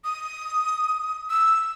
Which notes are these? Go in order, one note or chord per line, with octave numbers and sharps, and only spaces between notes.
D#6
E6